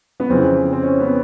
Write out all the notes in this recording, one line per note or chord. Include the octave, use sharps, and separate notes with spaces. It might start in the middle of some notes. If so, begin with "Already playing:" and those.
B3
F2 C#3 E3 C4
C4
C#4
B3